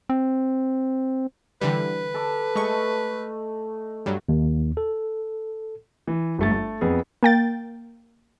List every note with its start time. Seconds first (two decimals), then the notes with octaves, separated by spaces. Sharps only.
0.09 C4
1.61 D3 E3 G3 B4
2.14 A4 D6
2.55 G#3 A3 D#5 C#6
4.06 G2 F#3 G3
4.29 D#2
4.77 A4
6.07 E3
6.39 G1 A3 A6
6.51 A3
6.81 F2 B3 G#4
7.23 A#3 G5 A6